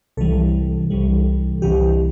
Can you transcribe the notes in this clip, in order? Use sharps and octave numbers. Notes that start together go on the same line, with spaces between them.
C2 C3 E3 G3 A4
C2 C3 E3 G3
C2 C3 E3 G4